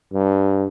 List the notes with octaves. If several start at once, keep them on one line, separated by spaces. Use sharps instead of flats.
G2